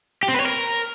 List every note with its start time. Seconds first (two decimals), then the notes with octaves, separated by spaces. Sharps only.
0.23 G4
0.29 C4
0.34 B4
0.40 C#5
0.46 A#4